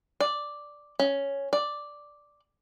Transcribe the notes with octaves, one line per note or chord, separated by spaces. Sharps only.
D5
C#4
D5